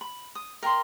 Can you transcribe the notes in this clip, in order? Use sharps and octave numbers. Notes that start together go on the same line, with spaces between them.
B5
D#6
A#4 G5 A#5 C6